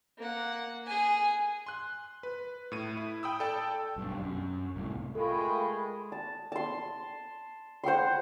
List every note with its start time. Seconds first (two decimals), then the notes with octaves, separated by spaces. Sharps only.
0.18 A#3 F#5
0.86 G#4 G#5
1.66 C6 F#6
2.23 B4
2.72 A2 D#7
2.97 E4
3.23 G5 B5 D#6 E6
3.40 A4 D5 G5 A5
3.96 B1 G2
4.20 F#2
4.76 C2 A2
5.15 G#3 A3 F4 A4 A#4 G5 B5 C#6
6.12 A5
6.52 A5 C6
7.84 C5 F#5 G5 C6